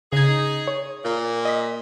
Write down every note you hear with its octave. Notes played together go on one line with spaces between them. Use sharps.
C#3 D#4 G#4 G#6
C#5
A#2
D#5 B6